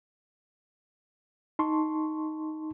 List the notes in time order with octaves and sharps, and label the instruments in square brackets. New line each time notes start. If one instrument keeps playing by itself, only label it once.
[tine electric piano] D#4 A5 C6 C#6